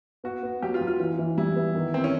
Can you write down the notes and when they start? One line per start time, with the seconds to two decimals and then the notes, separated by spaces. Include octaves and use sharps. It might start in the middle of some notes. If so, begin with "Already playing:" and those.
0.24 B3 F#4
0.43 B3
0.62 F#3 G4
0.74 F4
0.81 F#3
0.87 F4
1.00 E3
1.18 E3
1.37 G3 E4
1.56 B3
1.75 D#3
1.94 B3 C4
2.04 C#4